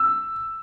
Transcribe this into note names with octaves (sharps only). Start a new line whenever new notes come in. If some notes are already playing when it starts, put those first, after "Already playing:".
Already playing: E6